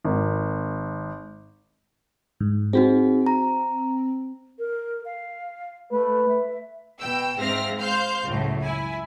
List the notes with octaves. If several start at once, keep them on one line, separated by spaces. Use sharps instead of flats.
G#1
G#2
C4 D#4 F#4 G#4
A#5
A#4
F5
A3 B4
E5
B2 G5 E6
G#2 C4 E5 F5 F6 A#6
C5 F5 F6 G6
C#2 F#2 A2
E4 G#5